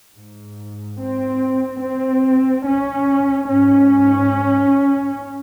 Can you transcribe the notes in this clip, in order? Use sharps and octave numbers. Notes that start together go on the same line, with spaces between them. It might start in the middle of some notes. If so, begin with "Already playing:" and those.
G#2
C4
C4
C#4
G#2 C#4